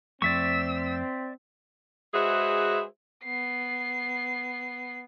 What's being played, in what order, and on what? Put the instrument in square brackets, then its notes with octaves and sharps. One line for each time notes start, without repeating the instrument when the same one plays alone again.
[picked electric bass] F2 F3 A3 [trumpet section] C4 [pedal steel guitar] D5 E5 C#6 [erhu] E6
[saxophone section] G#3 F#4 G#4 B4 C5 E5
[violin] B3 C7